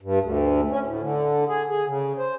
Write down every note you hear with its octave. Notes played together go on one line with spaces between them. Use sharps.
G2
D2
C#4
A2
D3
G#4
G#4
C#3
C5